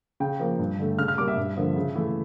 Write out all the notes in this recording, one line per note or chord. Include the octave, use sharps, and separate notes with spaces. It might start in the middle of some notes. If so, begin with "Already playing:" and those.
C#3 G5
F3 A#3
G2
D3 A3
C#3 F6
F6
G3 A#3 D6
E5
G2
D3 F3 A#3
C#3
E3 A3